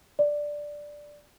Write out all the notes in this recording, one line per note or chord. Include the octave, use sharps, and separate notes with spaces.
D5